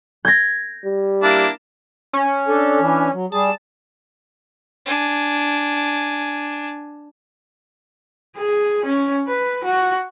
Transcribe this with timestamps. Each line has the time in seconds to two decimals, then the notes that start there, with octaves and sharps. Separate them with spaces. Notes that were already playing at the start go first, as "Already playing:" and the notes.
0.25 G6 G#6 A#6
0.85 G3
1.22 A#3 D4 E4
2.13 C#4
2.48 D4 A4
2.80 E3 D4
3.13 F#3
3.32 G3 G#4 A5
4.86 D4 G#5
8.37 G#4
8.85 C#4
9.28 B4
9.64 F#4